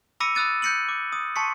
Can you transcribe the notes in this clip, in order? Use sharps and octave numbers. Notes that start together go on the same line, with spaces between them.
B5 D6 E6 A#6 C#7 D#7
B5 D#6 E6 F#6 A6 D#7
F#6 G6 A#6 C#7 D#7 F#7
D6
D#6
A5 C6 C#6 B6 C#7